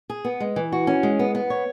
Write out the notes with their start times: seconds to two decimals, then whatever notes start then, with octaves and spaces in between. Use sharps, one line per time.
0.10 G#4
0.25 B3
0.40 G#3
0.56 E3
0.72 F#4
0.87 C#4
1.03 G#3
1.19 B3
1.35 B3
1.50 C#5